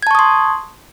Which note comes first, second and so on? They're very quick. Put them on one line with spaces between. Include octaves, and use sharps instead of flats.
G#6 A5 C#6 D#6 C6